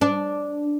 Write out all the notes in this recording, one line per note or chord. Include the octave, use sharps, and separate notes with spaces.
D4